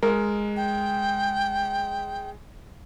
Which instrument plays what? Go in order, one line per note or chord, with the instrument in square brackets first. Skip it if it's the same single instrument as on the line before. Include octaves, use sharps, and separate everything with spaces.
[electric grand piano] G#3 [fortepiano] A#4
[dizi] G5